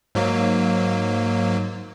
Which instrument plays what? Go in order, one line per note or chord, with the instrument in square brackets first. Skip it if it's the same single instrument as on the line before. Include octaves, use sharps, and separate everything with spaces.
[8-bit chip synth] G#2 F#3 A#3